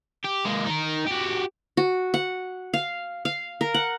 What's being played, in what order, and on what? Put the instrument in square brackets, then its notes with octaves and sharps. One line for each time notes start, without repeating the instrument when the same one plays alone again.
[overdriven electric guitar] G4
G#3 A#3
D#4 A#4
F#4 G4
[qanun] F#4
F#5
F5
F5
A#4
F#5